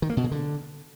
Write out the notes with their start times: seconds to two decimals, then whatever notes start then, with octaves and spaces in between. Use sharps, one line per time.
0.02 D#3
0.10 A#3
0.17 B2
0.24 C#3
0.31 D3